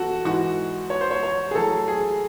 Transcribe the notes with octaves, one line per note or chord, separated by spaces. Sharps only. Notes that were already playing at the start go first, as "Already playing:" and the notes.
Already playing: F#4 A4
G#2 E3 F#4
C#5
C5
C#5
C#5
G#4
A2 F#3 A4
G#4